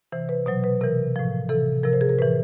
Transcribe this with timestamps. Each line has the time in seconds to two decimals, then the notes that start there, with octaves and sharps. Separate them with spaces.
0.12 C3 E3 C5
0.29 B4
0.46 B2 F#3 C5
0.64 B4
0.81 C3 E3 A#4
1.16 A2 F3
1.49 C3 E3 A4
1.84 C3 F3 A#4
1.93 C5
2.01 G#4
2.09 A#4
2.19 A2 E3 B4